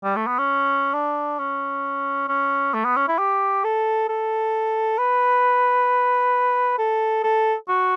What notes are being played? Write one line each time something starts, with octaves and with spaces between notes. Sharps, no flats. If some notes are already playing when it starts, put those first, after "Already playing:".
G3
A3
B3
C#4
D4
C#4
C#4
A3
B3
C#4
E4
G4
A4
A4
B4
A4
A4
F#4